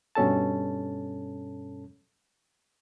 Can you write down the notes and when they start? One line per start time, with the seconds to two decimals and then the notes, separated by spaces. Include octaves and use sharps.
0.15 G2 B2 C#4 A4 A5